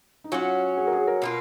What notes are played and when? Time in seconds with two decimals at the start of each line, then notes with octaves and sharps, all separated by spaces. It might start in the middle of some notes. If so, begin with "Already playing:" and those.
0.24 D#4
0.32 F#3 C#4 F4 F#4
0.77 G#4
0.87 A#4
0.92 G#4
1.07 A#4
1.22 B2 A#3 F4